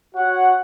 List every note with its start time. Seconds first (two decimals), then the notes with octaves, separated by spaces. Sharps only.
0.15 F#4 C#5 F#5